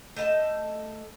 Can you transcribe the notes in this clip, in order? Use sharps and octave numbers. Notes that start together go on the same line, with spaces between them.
A3 D#5 A5